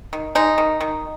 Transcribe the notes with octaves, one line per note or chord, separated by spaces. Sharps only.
D#3
G#3 D#4
D#3
D#3